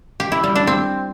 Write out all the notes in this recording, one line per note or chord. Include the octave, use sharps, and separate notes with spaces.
G4
E4
G3
D4
C4